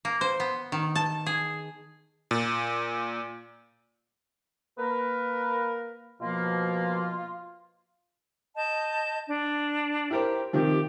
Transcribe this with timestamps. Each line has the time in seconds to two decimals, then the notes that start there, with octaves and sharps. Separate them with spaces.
0.05 A#3
0.21 C5
0.40 B3
0.72 D#3
0.95 A5
1.26 G#4
2.31 A#2
4.79 A#3 A#4 B4
6.21 B2 F3 A#3 F4
8.55 D#5 A5 G6
9.29 D4
10.11 E4 G4 A#4 C5 G5
10.53 C3 D#3 F3 G4